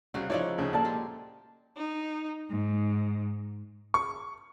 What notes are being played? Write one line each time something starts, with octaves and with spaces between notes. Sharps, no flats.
C2 C#3 F#4 G#4
F3 D#4 E4 F#4 C#5 D5
D2 C#3
A#2 A4 D5 A5
G#3 G4 G#4
D#4
G#2
C#6